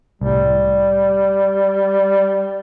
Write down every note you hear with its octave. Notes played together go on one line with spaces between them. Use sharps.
C2 A2 G3